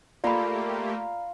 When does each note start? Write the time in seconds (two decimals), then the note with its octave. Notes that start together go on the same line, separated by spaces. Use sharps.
0.24 A3 A#3 F4 G4 D5 A#5 B5